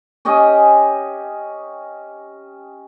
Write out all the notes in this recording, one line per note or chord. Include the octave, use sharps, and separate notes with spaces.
C#4 G4 D#5 G#5